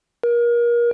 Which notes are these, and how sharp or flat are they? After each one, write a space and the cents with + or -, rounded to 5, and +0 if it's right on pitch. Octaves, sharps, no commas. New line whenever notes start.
A#4 +30